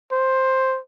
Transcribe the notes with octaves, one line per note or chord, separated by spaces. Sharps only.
C5